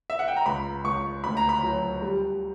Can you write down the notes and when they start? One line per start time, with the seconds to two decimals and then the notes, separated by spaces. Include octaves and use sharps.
0.10 E5
0.19 F#5
0.28 G5
0.36 A#5
0.46 C#2 B5
0.84 C#2 C#6
1.24 D2 B5
1.37 A#5
1.49 B5
1.63 F#3
2.02 G3